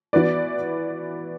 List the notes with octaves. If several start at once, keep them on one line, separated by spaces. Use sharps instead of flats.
E3 B3 F#4 B4 D5